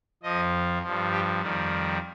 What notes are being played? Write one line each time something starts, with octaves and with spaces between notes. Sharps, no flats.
F2 F3 D#5
G2 F3
G4
F2 D#3 G3